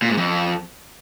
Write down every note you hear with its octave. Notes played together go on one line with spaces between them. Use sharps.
A#2
G#2
F2